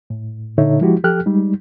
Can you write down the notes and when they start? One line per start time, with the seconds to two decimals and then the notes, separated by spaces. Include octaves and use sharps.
0.10 A2
0.58 A#2 D3 D#4 A4 C#5 E5
0.81 F3 G#3 E4 F#4 G4
1.04 F3 G4 A4 G5 F6 F#6
1.26 G3 G#3 D#4